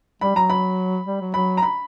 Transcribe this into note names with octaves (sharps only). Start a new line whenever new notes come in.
G3 B5
F#3 A#5
B5
G3
F#3
F#3 B5
A#5
B5